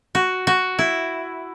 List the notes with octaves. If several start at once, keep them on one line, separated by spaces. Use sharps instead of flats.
F#4
F#4
E4